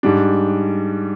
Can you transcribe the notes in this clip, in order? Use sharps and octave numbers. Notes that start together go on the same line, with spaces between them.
G#2 G3 D4